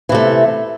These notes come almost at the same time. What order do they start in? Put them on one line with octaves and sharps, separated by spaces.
E3 C3 A3